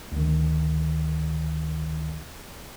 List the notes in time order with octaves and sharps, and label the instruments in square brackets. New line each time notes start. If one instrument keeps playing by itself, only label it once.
[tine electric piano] D2 D#3